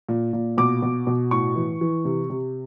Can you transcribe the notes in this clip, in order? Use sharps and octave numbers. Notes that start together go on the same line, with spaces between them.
A#2
A#2
B2 D6
B2
B2
A2 C#6
E3
E3
C3
C3